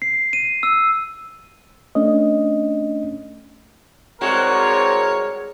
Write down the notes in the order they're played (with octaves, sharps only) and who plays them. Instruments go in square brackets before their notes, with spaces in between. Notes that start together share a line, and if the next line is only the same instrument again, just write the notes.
[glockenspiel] C7
D#7
E6
[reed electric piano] A3 C#4 D4 D#5
[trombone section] C2 C4 [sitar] G#3 F#4 [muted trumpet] A#4 [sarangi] C#5